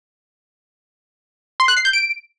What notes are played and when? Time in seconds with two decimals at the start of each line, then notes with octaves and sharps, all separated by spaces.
1.60 C6
1.68 F#6
1.77 C7
1.85 G6
1.93 D7